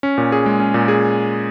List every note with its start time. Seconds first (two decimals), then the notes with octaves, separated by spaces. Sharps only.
0.03 C#4
0.18 A#2
0.32 G#4
0.46 G#3
0.60 C#4
0.74 A#2
0.88 G#4